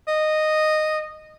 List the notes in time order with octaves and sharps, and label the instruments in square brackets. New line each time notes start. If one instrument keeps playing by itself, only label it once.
[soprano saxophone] D#5